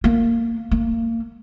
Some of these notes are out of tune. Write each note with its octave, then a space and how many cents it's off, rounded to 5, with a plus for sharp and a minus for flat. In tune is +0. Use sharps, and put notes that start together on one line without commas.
A#3 -15
A#3 -30